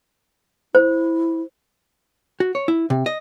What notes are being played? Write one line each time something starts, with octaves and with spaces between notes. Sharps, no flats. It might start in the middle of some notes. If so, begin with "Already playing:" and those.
E4 C5
F#4
C#5
E4
C3
D#5